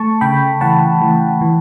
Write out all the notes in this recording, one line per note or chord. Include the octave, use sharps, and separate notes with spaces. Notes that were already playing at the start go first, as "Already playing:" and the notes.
Already playing: A3 A5 C#6
C#3 G5 B5
E3 F#5 A5
E3
E3